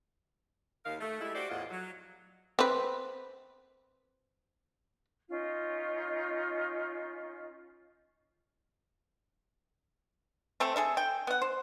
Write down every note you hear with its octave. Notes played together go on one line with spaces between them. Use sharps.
D#2 D#3 A#4 F5
A3
G3 G#3 E4
F#4 G4 C5 D5
E2 A2 F4 D#5 F#5
F#3
C4 B4
C#4 D#4 F4
A3 C4 A4
G#4 A4 E5
G5
B3 F#5
C5